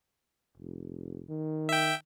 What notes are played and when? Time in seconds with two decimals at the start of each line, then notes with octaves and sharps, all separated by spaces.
0.58 F1
1.29 D#3
1.69 E5 G5